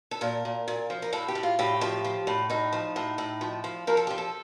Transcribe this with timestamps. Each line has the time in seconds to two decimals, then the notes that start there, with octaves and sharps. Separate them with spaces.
0.11 A4
0.21 A#2 A#4
0.45 A#2
0.68 A#2
0.90 F3
1.02 A#4
1.13 A2 A4
1.28 G4
1.35 A2
1.43 F4
1.59 A2 G4
1.81 F3
2.04 F3
2.27 A2
2.50 A2 D#4
2.73 F3
2.96 A2
3.18 A2
3.41 F3
3.64 F3
3.87 F3 A#4
3.97 A4
4.07 F3 G4
4.18 A4